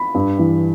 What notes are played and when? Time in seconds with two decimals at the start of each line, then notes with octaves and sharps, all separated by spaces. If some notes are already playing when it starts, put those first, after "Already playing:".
Already playing: B5
0.14 G2
0.38 E3